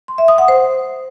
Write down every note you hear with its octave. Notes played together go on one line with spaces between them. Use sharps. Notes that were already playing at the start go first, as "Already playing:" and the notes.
C6
E5
D#6
F#5
C5